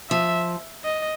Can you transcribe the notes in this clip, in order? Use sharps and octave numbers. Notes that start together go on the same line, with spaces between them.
F3 E5
D#5